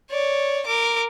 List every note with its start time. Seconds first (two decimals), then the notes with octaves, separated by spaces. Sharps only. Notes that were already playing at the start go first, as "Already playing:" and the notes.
0.11 C#5 D5
0.66 A#4 D6